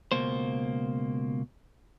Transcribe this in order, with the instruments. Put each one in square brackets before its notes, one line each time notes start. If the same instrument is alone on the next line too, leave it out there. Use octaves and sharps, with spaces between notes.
[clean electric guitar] C#2 B2 A#3 C5